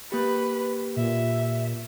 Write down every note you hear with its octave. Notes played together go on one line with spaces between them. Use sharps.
A#3 G4 B4
A#2 E5